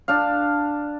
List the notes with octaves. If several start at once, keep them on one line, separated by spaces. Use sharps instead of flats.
D4 F5